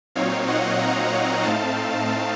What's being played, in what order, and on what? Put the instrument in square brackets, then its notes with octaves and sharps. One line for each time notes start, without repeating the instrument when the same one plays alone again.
[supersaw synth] A#2 F#3 C4 D#4 C#5 F5
D#5 F#5
F#5 A#5
A2 A3 C4 D#4 F5 A5